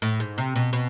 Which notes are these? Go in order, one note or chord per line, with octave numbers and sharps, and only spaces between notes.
A2
G#2
C3
B2
B2